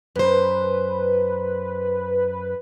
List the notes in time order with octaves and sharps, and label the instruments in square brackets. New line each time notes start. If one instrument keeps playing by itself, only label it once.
[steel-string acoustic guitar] F#2 C5 [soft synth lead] B4